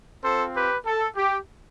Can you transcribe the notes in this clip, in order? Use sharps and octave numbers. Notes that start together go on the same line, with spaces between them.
C4 F4 A4 C5
G4 B4
A4
G4